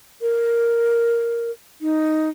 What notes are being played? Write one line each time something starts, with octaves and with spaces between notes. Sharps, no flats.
A#4
D#4